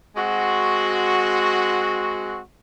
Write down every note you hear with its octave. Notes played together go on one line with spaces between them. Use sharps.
G#3 C4 F#4